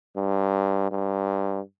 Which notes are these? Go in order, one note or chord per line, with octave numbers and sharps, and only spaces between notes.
G2
G2